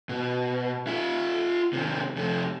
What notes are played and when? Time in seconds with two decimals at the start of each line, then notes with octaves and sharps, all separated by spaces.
0.09 B2
0.87 F4 E5
1.73 C3 D#3
2.16 F2 C3